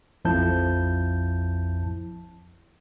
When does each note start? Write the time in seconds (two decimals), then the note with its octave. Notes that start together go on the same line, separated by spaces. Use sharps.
0.24 A#1 F2 F3 E4 A5 G6